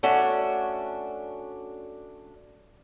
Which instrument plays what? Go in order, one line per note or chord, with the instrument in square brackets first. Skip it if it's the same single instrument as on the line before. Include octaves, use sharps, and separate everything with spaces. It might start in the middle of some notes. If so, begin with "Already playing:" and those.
[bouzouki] A3 C#4 D4 F#4